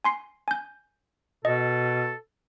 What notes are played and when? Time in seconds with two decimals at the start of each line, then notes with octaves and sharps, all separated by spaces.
0.04 G#5 C6 C7
0.48 G#5 G6
1.45 B2 A4 D#5